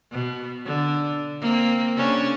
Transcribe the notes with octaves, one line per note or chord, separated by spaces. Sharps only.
B2
D3
A#3 C4
C#3 C#4 D4